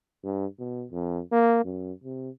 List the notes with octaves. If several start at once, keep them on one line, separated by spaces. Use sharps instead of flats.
G2
B2
F2
A#3
F#2
C3